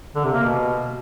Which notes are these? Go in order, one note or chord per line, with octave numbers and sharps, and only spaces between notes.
D3
C3
A#3
B2